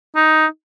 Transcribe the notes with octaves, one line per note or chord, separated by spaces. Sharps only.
D#4